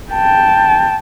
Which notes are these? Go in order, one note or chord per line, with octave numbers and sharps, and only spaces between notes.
G5 A5